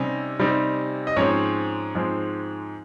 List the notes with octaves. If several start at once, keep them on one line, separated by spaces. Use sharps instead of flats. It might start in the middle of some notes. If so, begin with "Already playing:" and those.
Already playing: C3 G3 C4 C#4 D#4
C3 G3 C4 D#4
D#5
G#2 F3 G#3 C4 C#4 C#5
G#2 F3 G#3 C4